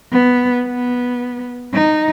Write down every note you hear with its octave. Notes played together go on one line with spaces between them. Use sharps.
B3
B3
D#4